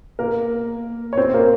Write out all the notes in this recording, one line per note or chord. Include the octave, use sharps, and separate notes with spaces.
A#3 A#4
C#5
C4 C5
A#3 A#4